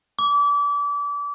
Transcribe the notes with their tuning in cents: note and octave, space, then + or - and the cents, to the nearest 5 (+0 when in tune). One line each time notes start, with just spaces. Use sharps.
D6 -30